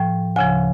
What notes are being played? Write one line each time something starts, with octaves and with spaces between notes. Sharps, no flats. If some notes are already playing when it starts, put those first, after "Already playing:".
Already playing: A2 F3 G5
D2 C#3 F3 G#5